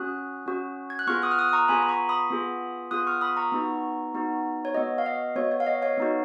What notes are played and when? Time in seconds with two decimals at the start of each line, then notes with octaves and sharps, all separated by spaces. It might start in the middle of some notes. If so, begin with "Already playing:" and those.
Already playing: C#4 F#4 D#6 F#6
0.46 C#4 F#4
0.90 G#6
0.99 F#6
1.07 B3 F4 G#4 C#6 F6
1.22 D#6 F#6
1.31 F6
1.39 D#6 F#6
1.49 D#6
1.53 A#5 C#6
1.68 B3 F4 G#4 G#5 B5
1.83 B5
1.89 A#5 C#6
2.09 B5 D#6
2.30 B3 F4 G#4
2.91 B3 F4 G#4 D#6 F#6
3.07 C#6 F6
3.21 B5 D#6
3.37 A#5 C#6
3.52 B3 D#4 F#4
4.14 B3 D#4 F#4
4.65 C#5
4.74 B3 F#4 D#5
4.98 F5
5.06 D#5
5.36 B3 F#4 C#5
5.52 C#5
5.60 F5
5.67 D#5
5.82 C#5 F5
5.98 B3 D#4 F#4